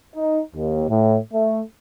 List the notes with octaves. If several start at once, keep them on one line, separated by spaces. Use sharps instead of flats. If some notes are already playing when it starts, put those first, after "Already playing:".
D#4
D#2
A2
A3